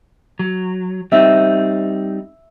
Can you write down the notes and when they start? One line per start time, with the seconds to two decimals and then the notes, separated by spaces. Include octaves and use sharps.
0.39 F#3
1.12 G3 C4 D#4 E5